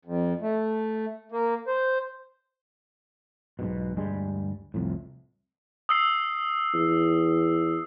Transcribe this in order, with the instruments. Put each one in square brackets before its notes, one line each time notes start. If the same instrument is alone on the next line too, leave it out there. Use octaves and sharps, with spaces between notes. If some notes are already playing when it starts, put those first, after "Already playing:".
[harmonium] F2
A3
A#3
C5
[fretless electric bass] B1 G#2 B2
D2 G2 G3 G#3
C2 F2 A2
[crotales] D#6 E6 C7
[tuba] E2